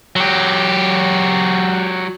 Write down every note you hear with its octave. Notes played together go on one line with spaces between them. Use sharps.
F#3 G4